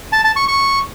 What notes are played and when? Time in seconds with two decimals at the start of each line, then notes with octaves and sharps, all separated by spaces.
0.12 A5
0.24 A5
0.36 C#6
0.48 C#6